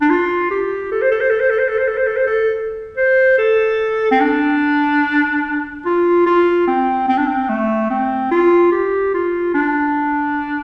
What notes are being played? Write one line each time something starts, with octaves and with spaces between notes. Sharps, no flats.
D4
F4
G4
A4
C5
A4
C5
A4
C5
A4
C5
A4
C5
A4
C5
A4
C5
A4
C5
A4
C4
D4
F4
F4
C4
C4
D4
C4
A3
C4
F4
G4
F4
D4